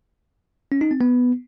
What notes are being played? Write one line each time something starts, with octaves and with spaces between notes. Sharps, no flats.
C#4
D#4
C4
B3